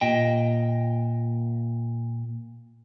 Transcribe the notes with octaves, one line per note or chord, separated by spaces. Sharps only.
A#2 D#5 G5